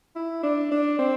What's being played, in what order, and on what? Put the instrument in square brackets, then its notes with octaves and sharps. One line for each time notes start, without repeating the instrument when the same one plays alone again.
[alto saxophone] E4
D4
D4
C4